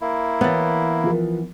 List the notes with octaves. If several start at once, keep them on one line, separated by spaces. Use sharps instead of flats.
A#3 E4
E3 B3 C#5 A6
F3 A#4